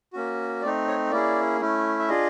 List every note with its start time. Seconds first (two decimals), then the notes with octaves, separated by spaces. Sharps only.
0.13 A#3 C#4 F#4
0.62 A3 C4 D#4 D5
0.88 C#5
1.11 A#3 C#4 E4 G#4 D5
1.60 A3 C#4 E4
1.99 E5
2.08 D4 F4 G#4 D#5